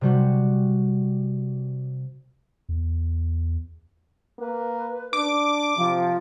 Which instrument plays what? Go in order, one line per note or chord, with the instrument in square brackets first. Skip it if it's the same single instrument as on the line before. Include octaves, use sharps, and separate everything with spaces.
[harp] C3 G3 F#4
[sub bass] E2
[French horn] A#3 [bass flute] B4
[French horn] D4 [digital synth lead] D6
[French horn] C3 [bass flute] F3